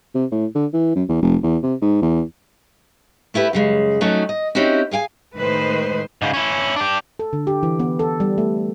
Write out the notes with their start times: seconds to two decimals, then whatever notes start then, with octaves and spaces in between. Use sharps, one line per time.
0.15 C3
0.31 A2
0.55 D3
0.73 E3
0.95 F#2
1.09 E2
1.22 F1
1.43 E2
1.63 C3
1.82 G#2
2.02 E2
3.34 A3 E4 G4 B4
3.53 F#2 C#3 G#3
4.01 F#3 A3 C#4 D#4 F#4
4.29 D#5
4.55 C4 C#4 D#4 E4 F#4 G4
4.91 G#4 F5 G5 G#5
5.37 A2 D#3 G#3 B4 C5
6.22 G#2 C#3
6.34 C#4 E4
6.76 D4 G4
7.19 A4
7.33 D3
7.47 G4
7.63 E3
7.80 B3
7.99 A4
8.20 G3
8.38 A3